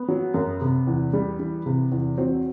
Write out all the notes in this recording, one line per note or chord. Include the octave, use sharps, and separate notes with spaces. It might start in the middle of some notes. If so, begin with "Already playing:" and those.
Already playing: B3
F#3
F#2
C3
E2
G3
E3
C3
E2
F#3 C4